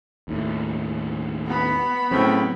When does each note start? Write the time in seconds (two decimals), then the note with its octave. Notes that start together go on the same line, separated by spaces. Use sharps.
0.28 D#2 A2
1.46 B3 B5
2.11 A2 C#3 F#3 C4